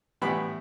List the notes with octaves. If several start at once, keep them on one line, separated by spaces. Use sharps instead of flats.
A2 E3 G3 B3 B5